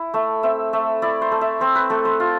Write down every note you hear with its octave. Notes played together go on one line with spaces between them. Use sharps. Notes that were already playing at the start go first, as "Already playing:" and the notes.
Already playing: E4
A3 E5
C4 E5
A3 E5
E4 D5
C5
A3
E5
C4 C5
B4
A3 A4
C5
F4